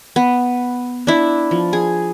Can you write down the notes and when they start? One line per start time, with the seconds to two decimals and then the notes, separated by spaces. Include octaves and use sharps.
0.16 B3
1.07 D4 E4
1.51 F3
1.73 G#4